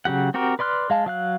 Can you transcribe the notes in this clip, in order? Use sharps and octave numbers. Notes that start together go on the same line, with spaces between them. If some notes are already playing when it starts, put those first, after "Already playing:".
C#3 F#3 G4 F#5
C4 F#4 G4 A#4
B4 D5 C6 F6 F#6
G#3 F5 A5
F#3 F5 F#6